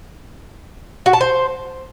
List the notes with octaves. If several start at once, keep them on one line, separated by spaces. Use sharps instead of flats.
F#4
A5
C5